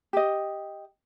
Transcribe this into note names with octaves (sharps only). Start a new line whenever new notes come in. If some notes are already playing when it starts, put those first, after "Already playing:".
G4 D#5